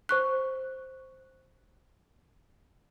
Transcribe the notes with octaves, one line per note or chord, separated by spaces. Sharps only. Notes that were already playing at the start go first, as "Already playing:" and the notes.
C5 C#6 F#6